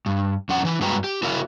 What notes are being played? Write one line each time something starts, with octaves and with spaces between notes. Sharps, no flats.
G2
F2 C#4 F#5
E3 E4
G2 G#3 F#4 B4 G5 A#5
G4
E4 F#4 A#4 E5 F5